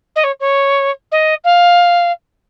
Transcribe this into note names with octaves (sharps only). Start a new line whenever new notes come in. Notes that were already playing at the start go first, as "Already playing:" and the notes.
D#5
C#5
C#5
D#5
F5